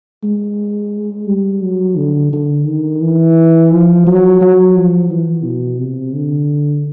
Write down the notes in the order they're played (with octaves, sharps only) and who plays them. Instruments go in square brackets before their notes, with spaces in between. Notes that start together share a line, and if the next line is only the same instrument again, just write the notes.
[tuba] G#3
G3
F#3
D3
D3
D#3
E3
F3
F#3
F#3
F3
E3
B2
C3
D3